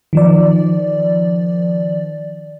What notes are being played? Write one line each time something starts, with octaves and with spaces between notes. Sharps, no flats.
D#3 F3 D5